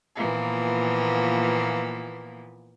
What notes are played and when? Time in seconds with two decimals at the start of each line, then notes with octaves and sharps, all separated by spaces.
0.15 A#2 E3 F3 A#3 B3